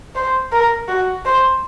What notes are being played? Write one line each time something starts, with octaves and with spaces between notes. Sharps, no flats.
C5
A#4
F#4
C5